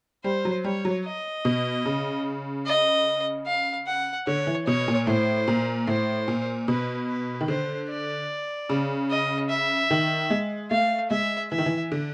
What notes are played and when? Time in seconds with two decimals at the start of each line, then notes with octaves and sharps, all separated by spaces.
0.24 G3 C5
0.45 F#3
0.64 G3 C#5
0.85 F#3
1.05 D#5
1.45 B2
1.86 C#3
2.66 D#5
3.46 F5
3.87 F#5
4.27 D3 C#5
4.47 E3
4.67 B2 C#5
4.88 A#2
5.07 A2 C5
5.48 A#2
5.88 A2 C5
6.28 A#2
6.68 B2 B4
7.08 B4
7.41 D#3
7.48 D3 C5
7.89 D5
8.70 C#3
9.10 D#5
9.50 E5
9.90 D#3
10.30 G#3
10.71 A3 F5
11.11 G#3 E5
11.51 E3 E5
11.58 D#3
11.66 E3
11.92 D3